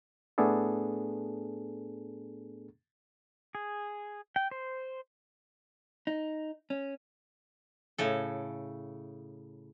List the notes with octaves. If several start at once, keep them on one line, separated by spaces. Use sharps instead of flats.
A2 A3 B3 D4 G#4 A4
G#4
G5
C5
D#4
C#4
A2 C#3 A4